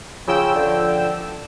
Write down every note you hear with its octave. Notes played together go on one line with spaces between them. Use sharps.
C#3 F3 G5 E6
D3